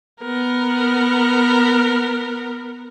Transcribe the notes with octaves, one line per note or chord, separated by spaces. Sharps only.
B3 A#4